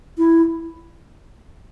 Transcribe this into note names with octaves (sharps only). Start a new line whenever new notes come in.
E4